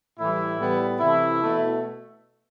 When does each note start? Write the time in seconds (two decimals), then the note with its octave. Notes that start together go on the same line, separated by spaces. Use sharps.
0.19 A2 E3 G3 E4
0.59 A2 G3 B3
0.99 C3 E3 A3 E4
1.41 B2 A3